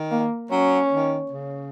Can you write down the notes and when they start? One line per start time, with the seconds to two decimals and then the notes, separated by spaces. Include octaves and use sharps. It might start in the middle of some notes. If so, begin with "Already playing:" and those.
Already playing: D#3
0.11 A#3
0.51 F#3 C#4
0.92 D#3
1.32 C#3